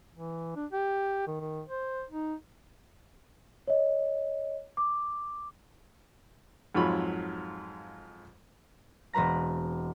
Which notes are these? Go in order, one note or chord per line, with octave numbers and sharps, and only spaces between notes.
E3
D4
G4
D#3
D#3
C5
D#4
C#5 D#5
D6
F2 G#2 F#3 F4 C#5 B5
E1 C4 B4 A#5 A#6